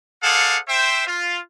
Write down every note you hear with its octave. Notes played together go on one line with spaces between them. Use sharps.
G#4 A4 C5 D5 F5 F#5
C5 E5 G5
F4